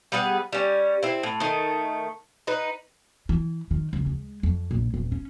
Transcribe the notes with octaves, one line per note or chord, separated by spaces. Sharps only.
G3 B3 G#4 F#5
G3 C#4
C4 E4
A2
D#3 A3
D#4 B4
E3
D#3
C#2
G#3
F2
A#1
D#1
C#4